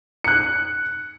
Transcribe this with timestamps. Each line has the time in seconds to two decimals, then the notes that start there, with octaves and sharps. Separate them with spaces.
0.24 F#6 C#7